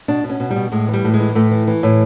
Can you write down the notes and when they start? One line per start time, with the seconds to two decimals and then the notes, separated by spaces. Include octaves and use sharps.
0.08 B2 D4
0.24 B2
0.29 C#4
0.40 B2
0.50 G3
0.56 B2
0.72 A2 G#3
0.88 E3
0.94 G3
1.04 A2
1.14 G#3
1.20 E3
1.35 A2 A3
1.51 E3
1.67 E3
1.83 A2